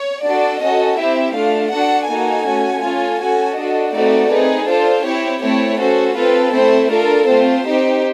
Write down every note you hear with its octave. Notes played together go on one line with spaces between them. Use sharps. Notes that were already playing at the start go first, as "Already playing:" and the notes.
Already playing: C#5
D4 F#4 A4 D5
C#4 F#4 A4 D#5
C4 E4 G4 E5
A3 D4 F4 F5
D4 F#4 A4 F#5
A#3 D#4 F#4 A4 G#5
A3 C#4 F#4
C#4 F4 A4
C#4 F#4 A4 G#5
D4 F#4 A4 D#5
A3 C4 D#4 F#4 A4 D5
C4 D#4 G#4 B4
D4 F4 A4 C5
C4 E4 G4 C#5
A3 C4 E4 C#5
C#4 F#4 A4 C5
C4 F4 A4 B4
A3 C4 E4 C5
D4 F4 A4 A#4
A3 C4 F4 C5
C4 D#4 G4